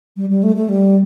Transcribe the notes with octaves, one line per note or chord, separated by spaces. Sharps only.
G3
G3
A3
A3
G3